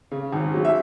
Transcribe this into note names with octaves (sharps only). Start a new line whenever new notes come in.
C#3
G#1
F#3
E5